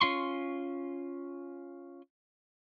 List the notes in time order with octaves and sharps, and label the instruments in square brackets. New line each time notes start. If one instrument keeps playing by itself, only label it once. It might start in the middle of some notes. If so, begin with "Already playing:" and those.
[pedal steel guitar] C#4 F4 C6 C#6